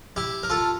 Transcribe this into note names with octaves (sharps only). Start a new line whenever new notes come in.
E4 G4
A#4
F4 A4